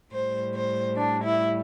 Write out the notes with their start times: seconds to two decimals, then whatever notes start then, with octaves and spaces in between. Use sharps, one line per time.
0.12 A2 G3 C5
0.54 C5
0.96 D4
1.24 E4